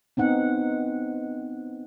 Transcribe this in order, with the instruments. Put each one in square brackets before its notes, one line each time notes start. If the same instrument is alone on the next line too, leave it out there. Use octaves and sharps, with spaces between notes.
[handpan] B3 C4 D#4 F#5